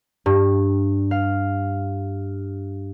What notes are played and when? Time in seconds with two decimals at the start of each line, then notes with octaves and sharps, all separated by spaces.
0.26 G2
1.11 F5